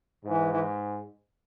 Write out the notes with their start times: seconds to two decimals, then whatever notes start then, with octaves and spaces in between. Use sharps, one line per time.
0.25 G#2 E3
0.53 E3